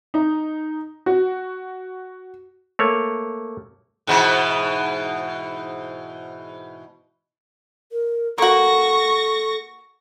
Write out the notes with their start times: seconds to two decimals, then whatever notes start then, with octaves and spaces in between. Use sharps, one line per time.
0.14 D#4
1.06 F#4
2.79 A3 A#3 C#5
4.07 G#2 B2 E3
7.92 A#4
8.38 A#3 F#4 A4 C#6 A#6